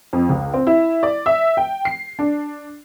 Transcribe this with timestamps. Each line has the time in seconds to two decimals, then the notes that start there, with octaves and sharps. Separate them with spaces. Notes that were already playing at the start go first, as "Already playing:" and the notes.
0.13 F2
0.29 C#2
0.54 C4
0.67 E4
1.03 D5
1.26 E5
1.57 G5
1.85 C7
2.19 D4